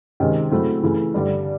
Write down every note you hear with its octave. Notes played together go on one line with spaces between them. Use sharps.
C3 D#3 G#3 C#4
C#3 F#3 A3 C4 E4
C#3 E3 A3
G2 D3 G3